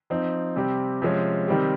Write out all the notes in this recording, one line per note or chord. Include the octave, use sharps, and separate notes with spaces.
F3 C4 D#4
C3 G3 C4 G4
C3 F3 G#3 C#4
C3 D#3 G3 C4 G4